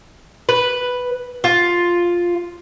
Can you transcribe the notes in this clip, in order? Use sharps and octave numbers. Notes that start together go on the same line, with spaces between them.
B4
F4